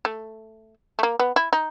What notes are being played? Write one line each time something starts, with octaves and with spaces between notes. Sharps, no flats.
A3
A3
A#3
B3
E4
D#4